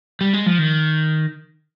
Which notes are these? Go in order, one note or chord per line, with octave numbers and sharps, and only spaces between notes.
G3
G#3
F3
D#3